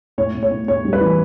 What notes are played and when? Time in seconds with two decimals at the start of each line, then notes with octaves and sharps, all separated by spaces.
0.18 A2 C#5
0.34 A2
0.43 C#5
0.51 A2
0.68 A2 C#5
0.85 G3
0.93 B4
1.01 E3